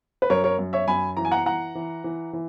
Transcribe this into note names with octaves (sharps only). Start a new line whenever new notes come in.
B4
F#2 A#4 C#5
A#4 C#5
F#2
C#5 E5
F#2 G#5 B5
E3 A#5
G#5
F#5 A#5
E3 F#5 A#5
E3
E3
E3